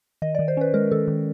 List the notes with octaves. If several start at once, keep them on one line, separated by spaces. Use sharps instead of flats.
D#3 D#5
D5
D#3
C5
C#4 B4
G#3 A#4
D#3 A4
D#3